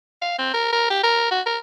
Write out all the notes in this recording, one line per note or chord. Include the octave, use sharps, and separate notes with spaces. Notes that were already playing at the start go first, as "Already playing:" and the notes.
F5
C4
A#4
A#4
G4
A#4
F#4
A#4